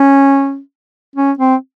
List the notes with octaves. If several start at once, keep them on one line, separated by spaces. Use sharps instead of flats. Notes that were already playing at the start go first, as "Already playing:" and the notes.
Already playing: C#4
C#4
C4